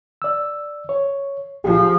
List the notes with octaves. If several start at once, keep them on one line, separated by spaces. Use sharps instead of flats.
D5 E6
C#5
F3 G4 G#4